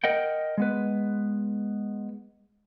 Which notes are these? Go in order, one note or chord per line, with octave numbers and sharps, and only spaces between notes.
A#4 D#5 F#5 G5
G#3 B3 B4